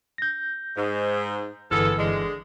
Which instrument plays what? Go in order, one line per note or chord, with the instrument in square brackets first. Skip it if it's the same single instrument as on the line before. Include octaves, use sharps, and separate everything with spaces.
[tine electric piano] G6 A#6
[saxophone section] G#2
[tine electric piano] G1 E3 F6 [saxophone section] G#3 B3 A4
[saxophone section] D3 G#3